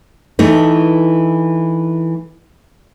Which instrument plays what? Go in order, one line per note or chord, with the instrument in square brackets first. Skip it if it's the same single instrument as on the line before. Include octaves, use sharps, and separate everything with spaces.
[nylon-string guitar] E3 A3 D#4